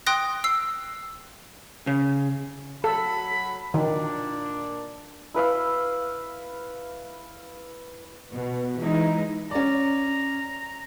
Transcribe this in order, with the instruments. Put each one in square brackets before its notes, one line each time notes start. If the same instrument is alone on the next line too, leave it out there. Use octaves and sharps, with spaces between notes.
[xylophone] G5 C6 D#6 F#6 A#6
E6 C7
[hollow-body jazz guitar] C#3
[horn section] F#3 B5 [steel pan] A4
[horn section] A#2 D4 [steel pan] D#3
[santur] E4 B4 F5 E6
[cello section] B2
E3 G#3 D#4 E4
[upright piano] C#4 D5 [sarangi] A#5